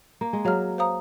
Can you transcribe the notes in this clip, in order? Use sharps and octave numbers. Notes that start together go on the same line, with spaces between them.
A#3
G#3
F#3 G#4 C#5 F5 A#5 F6
C5 F5 A#5 D#6